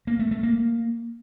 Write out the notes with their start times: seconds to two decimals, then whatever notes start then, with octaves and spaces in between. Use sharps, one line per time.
0.07 A#3
0.19 A3
0.31 A3
0.43 A#3